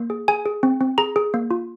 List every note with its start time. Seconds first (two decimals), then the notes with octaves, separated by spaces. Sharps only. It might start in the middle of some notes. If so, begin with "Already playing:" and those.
Already playing: A#3
0.10 G#4
0.28 G#4 G#5
0.46 G#4
0.63 C4
0.81 C4
0.98 G#4 A#5
1.16 G#4
1.34 A#3
1.51 F4